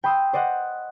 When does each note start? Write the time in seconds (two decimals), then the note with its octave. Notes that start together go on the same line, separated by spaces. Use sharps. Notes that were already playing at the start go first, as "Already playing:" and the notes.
0.04 G5 B5 C6 D#6 E6
0.33 C5 D5 D#5 F#5